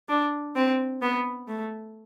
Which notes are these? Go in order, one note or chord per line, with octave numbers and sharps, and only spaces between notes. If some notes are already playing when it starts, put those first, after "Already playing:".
D4
C4
B3
A3